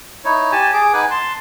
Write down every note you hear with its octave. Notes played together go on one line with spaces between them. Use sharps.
D#4 E4 C#5
G4 G#5 A5
G#4 D6
D#4 B4 F#5 G#5
A5 C6